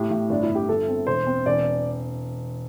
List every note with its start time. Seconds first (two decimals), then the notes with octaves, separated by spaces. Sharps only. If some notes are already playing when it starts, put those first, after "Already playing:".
Already playing: A2 G4
0.10 A2
0.29 G1 D4
0.43 E4
0.49 G1
0.55 G4
0.68 G1 A4
0.89 C4
1.07 E1 C5
1.27 C4
1.46 E1 D5